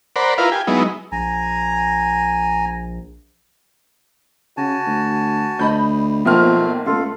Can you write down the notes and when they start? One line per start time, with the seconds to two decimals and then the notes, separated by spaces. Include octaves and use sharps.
0.16 A#4 C5 D5 F#5 B5
0.38 E4 F4 A#4 B4 F5
0.52 G4 G#5
0.67 F#3 G#3 B3 D#4 E4
1.12 A#1 G#5 A#5
4.57 C#3 F#4 G#5 A5
4.87 D2
5.59 D2 D#5 B5 G6
6.25 B1 F3 A3 A#3 C4 F6
6.86 C#2 A3 F4 A4 F5